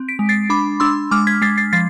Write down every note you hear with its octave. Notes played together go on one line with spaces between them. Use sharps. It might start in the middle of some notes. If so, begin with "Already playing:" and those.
Already playing: C4
B6 D7
G#3
A6 C7
D4 B5 D6
D4 C6 E6
G#3 D6 F6
G#6 B6
G#3 A6 C7
A6 C7
F3 A6 C7